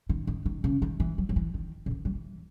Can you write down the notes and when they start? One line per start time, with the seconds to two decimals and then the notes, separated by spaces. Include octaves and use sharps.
0.09 D#3
0.27 D#3
0.46 D#3
0.64 C#3
0.82 D#3
1.00 E3
1.18 F#3
1.29 F#3
1.36 E3
1.54 D#3
1.86 C#3
1.91 D#3
2.05 F#3
2.15 E3